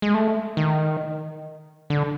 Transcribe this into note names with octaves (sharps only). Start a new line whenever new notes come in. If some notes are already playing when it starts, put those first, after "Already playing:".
G#3
A3
D#3
D3